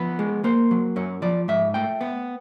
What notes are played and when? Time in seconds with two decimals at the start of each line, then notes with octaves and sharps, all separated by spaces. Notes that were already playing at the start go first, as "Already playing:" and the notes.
Already playing: F3 B3 B4
0.19 G#3
0.44 A#3 C5
0.71 F#3
0.96 F#2 C#5
1.22 F3 D5
1.48 G#2 E5
1.74 A3 G5
2.01 B3